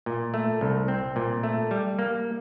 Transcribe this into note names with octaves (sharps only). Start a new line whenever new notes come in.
A#2
A3
C2
C4
A#2
A3
G3
A#3